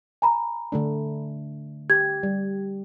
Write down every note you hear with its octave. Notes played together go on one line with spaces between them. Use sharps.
G#5 A#5 B5
D3 A3 D4
G4 G#6
G3